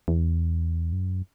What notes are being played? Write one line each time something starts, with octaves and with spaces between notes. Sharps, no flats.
E2
F#2